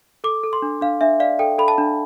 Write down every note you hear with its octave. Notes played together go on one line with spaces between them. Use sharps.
A4 D6
A4
C6
D4
D4 F5
D4 E5
D5 F5
A4 G5
A4 B5
A5
D4